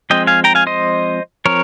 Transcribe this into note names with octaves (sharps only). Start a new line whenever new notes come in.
F3 G#3 C4 D#5 G5
F5 G#5
G5 A#5
F5 G#5
C5 D#5
F3 C4 A#4 C#5